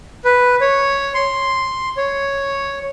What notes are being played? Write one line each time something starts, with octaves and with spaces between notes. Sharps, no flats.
B4
C#5
C6
C#5